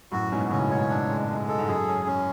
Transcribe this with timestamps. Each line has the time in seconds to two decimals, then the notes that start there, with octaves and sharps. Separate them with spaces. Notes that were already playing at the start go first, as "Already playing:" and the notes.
0.12 F#2 A2 F#4
0.31 G#2 B2 C#4
0.51 A2 C#3 C#4
0.70 G#2 B2 C#5
0.89 D4
1.09 G#3
1.29 G#3
1.48 A4
1.59 G#2
1.68 F#2 G#4
1.87 C#4
2.06 C#4